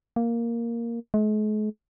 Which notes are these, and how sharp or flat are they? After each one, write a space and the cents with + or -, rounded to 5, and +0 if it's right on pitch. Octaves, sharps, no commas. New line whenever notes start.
A#3 +0
G#3 +45